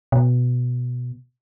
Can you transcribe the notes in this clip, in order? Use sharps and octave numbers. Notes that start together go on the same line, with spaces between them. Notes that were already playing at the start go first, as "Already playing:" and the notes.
B2